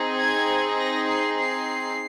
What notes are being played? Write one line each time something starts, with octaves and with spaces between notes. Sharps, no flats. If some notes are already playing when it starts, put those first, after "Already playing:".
Already playing: C4 D#4 G#4
G#6
A#6
C7
C7